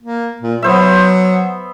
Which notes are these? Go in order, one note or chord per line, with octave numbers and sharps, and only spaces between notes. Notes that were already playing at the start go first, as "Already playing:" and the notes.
A#3
A#2
F#3 B3 C5 E5